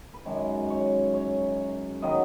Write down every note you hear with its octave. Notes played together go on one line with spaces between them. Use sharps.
B4
F#2 D#3 G#3 C#5
C#5
C#5
D#3 F#3 B3 D#5